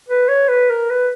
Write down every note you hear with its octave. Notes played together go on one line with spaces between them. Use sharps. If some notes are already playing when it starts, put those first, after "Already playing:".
B4
C#5
B4
A#4
B4